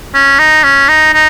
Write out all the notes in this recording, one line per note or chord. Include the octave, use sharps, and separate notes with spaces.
C#4
D#4
C#4
D#4
D#4